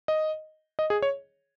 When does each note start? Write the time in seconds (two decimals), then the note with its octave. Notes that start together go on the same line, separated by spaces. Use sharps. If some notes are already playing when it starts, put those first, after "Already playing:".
0.08 D#5
0.79 D#5
0.90 G#4
1.02 C#5